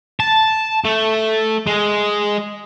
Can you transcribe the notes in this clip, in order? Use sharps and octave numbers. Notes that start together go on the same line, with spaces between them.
A5
A3
G#3